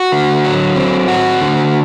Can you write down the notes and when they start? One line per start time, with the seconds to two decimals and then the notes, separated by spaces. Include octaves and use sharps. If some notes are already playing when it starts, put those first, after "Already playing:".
Already playing: F#4
0.12 D3
0.44 F#3
0.76 C4
1.08 F#4
1.41 D3